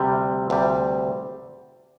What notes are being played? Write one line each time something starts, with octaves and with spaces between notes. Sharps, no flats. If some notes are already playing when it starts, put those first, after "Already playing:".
Already playing: D2 C3 G3
D2 C3 G3